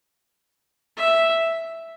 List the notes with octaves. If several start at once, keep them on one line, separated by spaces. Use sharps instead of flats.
E5